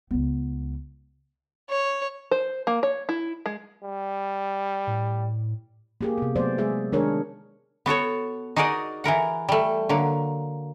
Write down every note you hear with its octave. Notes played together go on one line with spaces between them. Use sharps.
C#2 B3
C#5
C5
A#3
C#5
E4
G#3
G3
A2
A#3 G4 G#4
C3 B3
F#3 A3 B3 C5 D5
G#3 G#4 E5
D#3 G#3 D4 G#4 A#4 C#5
B3 F#4 A4 C#5
D#4 F#4 G#4 A#4 D5 D#5
E3 E4 A#4 F#5
G3 A3
D3 F#3 A#3